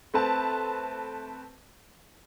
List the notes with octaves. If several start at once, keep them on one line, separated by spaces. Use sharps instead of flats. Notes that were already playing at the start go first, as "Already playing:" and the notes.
A3 C4 B4 A5